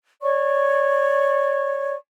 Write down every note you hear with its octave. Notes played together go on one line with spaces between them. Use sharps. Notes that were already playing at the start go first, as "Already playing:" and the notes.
C#5 D5 C#6